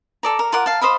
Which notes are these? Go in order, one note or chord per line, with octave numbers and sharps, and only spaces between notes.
A4 D5 A#5
A#4
F4 A#4 F#5 D6
F5 A5
C5 D#5 F5 B5